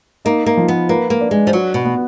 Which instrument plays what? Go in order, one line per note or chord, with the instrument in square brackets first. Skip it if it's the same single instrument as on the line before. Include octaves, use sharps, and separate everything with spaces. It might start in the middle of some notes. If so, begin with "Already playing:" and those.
[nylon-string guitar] A#3 [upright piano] D#4
[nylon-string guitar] A#3
[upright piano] F3
[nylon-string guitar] B3
[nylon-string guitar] A#3 [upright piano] B4
[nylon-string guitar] A#3
[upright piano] D4
[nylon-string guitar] G#3
F3
[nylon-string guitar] F#3 [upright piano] F#4
[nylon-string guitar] B2
[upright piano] B3